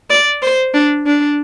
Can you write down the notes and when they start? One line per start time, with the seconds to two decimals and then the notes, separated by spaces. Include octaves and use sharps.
0.10 D5
0.42 C5
0.74 D4
1.06 D4